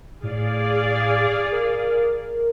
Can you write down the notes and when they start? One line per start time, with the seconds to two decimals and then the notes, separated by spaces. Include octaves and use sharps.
0.23 A2 G#4 D5 F5
1.52 A#4